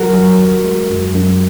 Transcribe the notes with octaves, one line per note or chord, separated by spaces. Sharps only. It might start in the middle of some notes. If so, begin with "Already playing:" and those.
Already playing: F#3 F#4 A#4
F#3
D#2
G#3
F#2
F#2